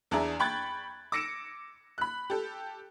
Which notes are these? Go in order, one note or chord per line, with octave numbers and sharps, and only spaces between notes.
E2 D4 G#4 E5 A#5
G5 B5 C#6 F#6 G#6 A6
D6 E6 A#6 C#7 D7 E7
B5 F#6
G4 A4